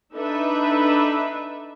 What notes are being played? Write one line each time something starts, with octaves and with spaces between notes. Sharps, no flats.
D4 D#4 A4 B4 E5